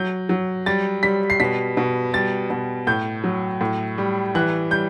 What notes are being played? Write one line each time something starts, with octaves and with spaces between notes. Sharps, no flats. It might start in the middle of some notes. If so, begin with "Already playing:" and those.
Already playing: F#3 G6
F#3
G3 A6
G3 B6
C7
B2 B6
B2
G3 A6
B2
A2 G6
F#3
A2
G3
E3 F#6
G3 G6